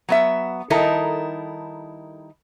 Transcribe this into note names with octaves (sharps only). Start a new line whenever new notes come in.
F#3 B3 E5
D#3 G3 D#4 E4 A4 A#4